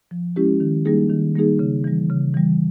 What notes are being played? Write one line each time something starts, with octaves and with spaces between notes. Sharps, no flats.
F3
G#3 C#4 E4 G4
D#3
G3 A#3 D#4 G#4
D#3
G3 A#3 D#4 G#4
C#3
E3 G3
C#3
E3 G3